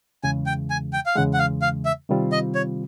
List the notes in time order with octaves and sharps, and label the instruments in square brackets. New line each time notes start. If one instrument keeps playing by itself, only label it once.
[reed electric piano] E2 C#3 E3 G#3 [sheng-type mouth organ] G#5
[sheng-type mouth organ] G5
G#5
G5
F5
[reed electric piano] E2 C#3 E3 G#3 [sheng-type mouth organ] F#5
[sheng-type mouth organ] F#5
F5
F5
E5
[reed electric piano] C3 D#3 G3 C4 F4
[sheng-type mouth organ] D#5
C#5